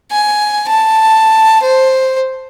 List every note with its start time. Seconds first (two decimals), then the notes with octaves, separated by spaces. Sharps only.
0.12 G#5
0.69 A5
1.63 C5